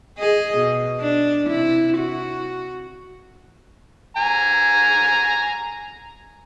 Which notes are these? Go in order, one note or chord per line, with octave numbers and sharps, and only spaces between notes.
G#4 D#5
B2
D4
C3 E4
F#4
G#5 A#5